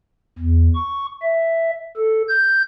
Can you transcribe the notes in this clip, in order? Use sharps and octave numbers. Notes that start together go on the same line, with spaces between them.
E2
C#6
E5
A4
G6